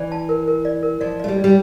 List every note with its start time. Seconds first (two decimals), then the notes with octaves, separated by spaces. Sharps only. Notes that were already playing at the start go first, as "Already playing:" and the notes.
Already playing: E3 D5
0.12 A5
0.29 A#4
0.48 A#4
0.65 D5
0.83 A#4
1.01 F3 D5
1.20 A3 D5
1.28 G3
1.37 D5
1.44 G3